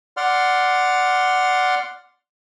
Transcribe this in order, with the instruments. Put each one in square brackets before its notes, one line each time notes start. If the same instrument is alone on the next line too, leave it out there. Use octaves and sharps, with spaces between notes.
[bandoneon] D5 F#5 C6 F6